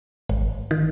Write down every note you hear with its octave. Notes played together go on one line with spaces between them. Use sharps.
G#1
D#3